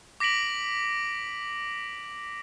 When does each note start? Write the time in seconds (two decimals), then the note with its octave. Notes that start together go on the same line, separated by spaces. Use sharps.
0.20 D6 A#6 B6 D7 F#7